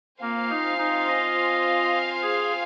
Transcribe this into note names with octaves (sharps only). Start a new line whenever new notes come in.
A#3 C4 F4 C5 F5 G#5
D#4
D#4
D#5
G#4